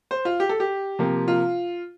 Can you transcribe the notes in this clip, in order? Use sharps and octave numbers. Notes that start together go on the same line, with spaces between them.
C5
F4
G4
A4
G4
C3 F3 A#3
F4